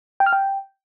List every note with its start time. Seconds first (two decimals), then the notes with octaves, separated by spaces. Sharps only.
0.20 G5
0.26 F6
0.33 G5